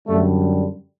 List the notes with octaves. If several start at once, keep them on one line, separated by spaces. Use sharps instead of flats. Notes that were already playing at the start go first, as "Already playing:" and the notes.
F#2 D3 G3 A3